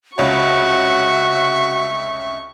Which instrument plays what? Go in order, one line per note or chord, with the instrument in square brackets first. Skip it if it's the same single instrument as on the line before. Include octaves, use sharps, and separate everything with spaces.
[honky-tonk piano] F1 C#2 C#5 [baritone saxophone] F#4 [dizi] E5 [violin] C#6